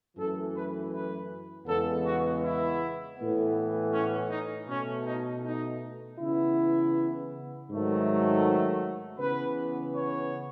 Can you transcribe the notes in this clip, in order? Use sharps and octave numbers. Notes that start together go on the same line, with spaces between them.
F#2 E3 A3 A4
B4
B4
E2 C#3 G#3 B3 A4
F#4
E4
A2 E3 B3
C#4
D#4
B2 A3 C#4
D#4
D#4
C#3 E3 B3 E4
G#2 D#3 F#3 A3
C#3 E3 B3 B4
C#5